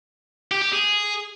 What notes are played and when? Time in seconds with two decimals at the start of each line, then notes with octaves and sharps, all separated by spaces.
0.51 G4
0.62 G4
0.73 G#4